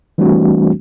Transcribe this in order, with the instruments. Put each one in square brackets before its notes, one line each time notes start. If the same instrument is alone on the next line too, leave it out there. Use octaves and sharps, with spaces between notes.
[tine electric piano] E3 G3 A3 C4 D4 F#4